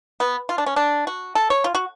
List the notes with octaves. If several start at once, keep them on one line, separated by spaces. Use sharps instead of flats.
B3
F4
D4
C#4
D4
F#4
A4
C#5
F4
F#4